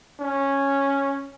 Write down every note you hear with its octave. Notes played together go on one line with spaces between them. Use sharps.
C#4